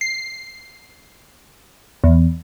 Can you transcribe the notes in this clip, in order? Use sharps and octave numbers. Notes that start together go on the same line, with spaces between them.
C7
E2